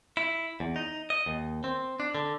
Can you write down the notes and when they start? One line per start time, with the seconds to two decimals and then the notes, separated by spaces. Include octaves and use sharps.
0.17 E4
0.60 E2
0.76 D#4
1.10 D#5
1.26 D#2
1.64 C4
2.00 D4
2.15 D3